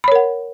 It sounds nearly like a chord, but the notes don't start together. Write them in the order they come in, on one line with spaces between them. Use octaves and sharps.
B5 C#5 A#4 F#5